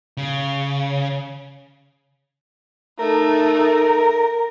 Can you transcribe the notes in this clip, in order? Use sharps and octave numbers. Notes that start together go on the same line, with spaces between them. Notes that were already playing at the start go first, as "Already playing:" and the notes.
C#3
A3 D#4 A#4